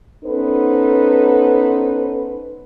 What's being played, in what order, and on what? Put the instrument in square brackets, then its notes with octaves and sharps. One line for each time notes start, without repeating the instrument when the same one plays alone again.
[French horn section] B3 C#4 D#4 A4 B4 C5